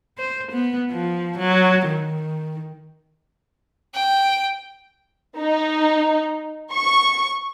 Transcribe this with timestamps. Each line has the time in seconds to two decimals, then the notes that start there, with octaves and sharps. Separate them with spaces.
0.18 C5
0.52 B3
0.91 F3
1.38 F#3
1.86 D#3
3.95 G5
5.38 D#4
6.73 C#6